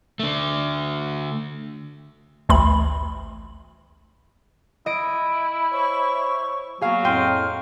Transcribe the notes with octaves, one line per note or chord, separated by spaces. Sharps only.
D3 A3
A1 D2 B5
E4 D#5 D7
C5 C#5 C#6
F#3 A#3 B3 F#4 G#4 F5
F2 A2 G5 C6 F6 D#7